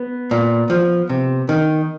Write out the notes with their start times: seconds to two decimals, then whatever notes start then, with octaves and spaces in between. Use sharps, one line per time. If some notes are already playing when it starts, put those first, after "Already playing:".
Already playing: B3
0.31 A#2
0.70 F3
1.09 C3
1.49 D#3